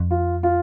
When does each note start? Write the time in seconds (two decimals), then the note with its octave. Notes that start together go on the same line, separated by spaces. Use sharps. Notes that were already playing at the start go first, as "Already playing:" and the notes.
Already playing: F2
0.11 F4
0.43 F4